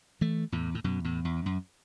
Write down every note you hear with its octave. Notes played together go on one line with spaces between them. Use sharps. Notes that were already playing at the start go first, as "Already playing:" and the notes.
E3 A3
E2 A2
A2
F#2 B2
E2 A2
E2
F#2